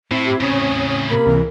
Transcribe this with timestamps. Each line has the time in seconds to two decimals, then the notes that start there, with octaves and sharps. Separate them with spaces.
0.11 A2 C4 E4
0.25 G4
0.40 A2 C#3 C#4 C#5 D#6
1.09 C3 A#3 B5
1.26 C#2 C3 E3 A#4